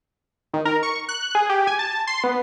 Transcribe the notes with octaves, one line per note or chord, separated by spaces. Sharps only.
D#3
A#4
C#6
F#6
G#4
G4
G#5
A5
C6
B3